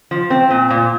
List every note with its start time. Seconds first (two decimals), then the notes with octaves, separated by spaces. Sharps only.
0.11 F3
0.30 C4
0.51 A#2
0.70 A#2